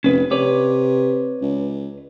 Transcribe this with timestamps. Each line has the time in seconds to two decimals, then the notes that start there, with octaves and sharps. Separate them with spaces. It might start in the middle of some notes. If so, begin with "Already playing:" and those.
0.04 F1 C#4 B4
0.31 C3 B4 C#5 D5
1.42 C#2